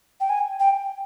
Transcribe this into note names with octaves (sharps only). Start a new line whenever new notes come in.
G5
G#5
G5